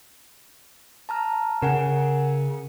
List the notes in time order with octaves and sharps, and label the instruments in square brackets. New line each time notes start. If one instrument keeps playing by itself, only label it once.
[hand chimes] A5 A#5 F6
[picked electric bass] C#3 [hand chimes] A#4 F#5 G#5